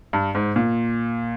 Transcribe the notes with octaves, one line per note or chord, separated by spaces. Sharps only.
G2
G#2
A#2